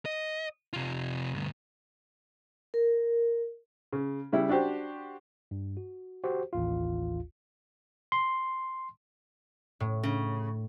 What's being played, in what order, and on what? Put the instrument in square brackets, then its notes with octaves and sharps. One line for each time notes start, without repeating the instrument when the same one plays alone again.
[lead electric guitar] D#5
C3 F4
D2 G2
[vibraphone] A#4
[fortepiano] C#3
C#3 G3 E4
D4 F#4 G4 C5
[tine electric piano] G2
F#4
F#4 G4 C5
A1 D#2 F4
C6
[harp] A2
[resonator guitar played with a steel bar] C#3